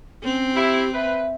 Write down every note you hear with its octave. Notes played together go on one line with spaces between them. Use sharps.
C4 C#4
E4 G4
B4 E5